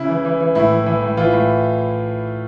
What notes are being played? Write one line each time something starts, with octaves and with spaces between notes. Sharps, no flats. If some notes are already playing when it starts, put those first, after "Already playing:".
Already playing: C#3 E4
E3
E3
E3
A2 E4
E3
E3
A2
E3 F4
A2